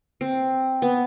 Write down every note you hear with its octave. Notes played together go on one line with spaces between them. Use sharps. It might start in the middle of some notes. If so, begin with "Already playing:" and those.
C4
B3